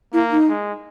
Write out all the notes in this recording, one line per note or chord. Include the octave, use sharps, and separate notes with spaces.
A#3 E4
D#4
G#3